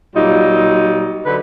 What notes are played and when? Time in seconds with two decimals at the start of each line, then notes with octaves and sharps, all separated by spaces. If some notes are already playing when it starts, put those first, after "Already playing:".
0.15 A#2 F#3 G3 D#4 F4
1.26 D3 F#3 B4